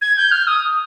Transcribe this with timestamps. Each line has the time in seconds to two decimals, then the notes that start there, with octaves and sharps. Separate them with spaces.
0.02 G#6
0.17 G6
0.32 F6
0.47 D#6